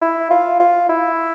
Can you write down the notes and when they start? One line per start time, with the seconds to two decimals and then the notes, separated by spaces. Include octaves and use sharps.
0.01 E4
0.30 F4
0.60 F4
0.89 E4